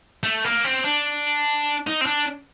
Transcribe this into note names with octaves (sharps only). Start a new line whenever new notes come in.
A3
A#3
C4
D4
D#4
C4
D4